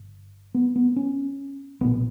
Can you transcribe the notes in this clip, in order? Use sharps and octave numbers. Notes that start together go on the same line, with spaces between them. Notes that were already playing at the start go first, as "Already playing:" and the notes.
Already playing: G1
B3
B3
C#4
B1 A#2 B3